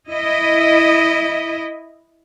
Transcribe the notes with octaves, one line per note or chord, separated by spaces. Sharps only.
E4 D#5